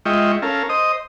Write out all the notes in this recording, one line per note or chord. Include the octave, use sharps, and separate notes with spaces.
G#3 F4 D#5 E5 G5 C#6
C#4 A4 A#4 F5
C5 D#5 D#6